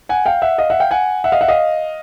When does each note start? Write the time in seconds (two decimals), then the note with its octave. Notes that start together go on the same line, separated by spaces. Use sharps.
0.09 F#5 G#5
0.26 F5 G5
0.42 E5 F#5
0.58 D#5 F5
0.70 E5 F#5
0.80 F5 G5
0.91 F#5 G#5
1.24 E5 F#5
1.32 D#5 F5
1.41 E5 F#5
1.48 D#5 F5